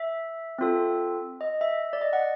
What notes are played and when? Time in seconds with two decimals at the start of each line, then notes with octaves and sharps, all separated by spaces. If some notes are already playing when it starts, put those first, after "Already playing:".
Already playing: E5
0.58 C4 F4 A4
1.41 D#5
1.61 E5
1.93 D5
2.01 D#5
2.13 F#5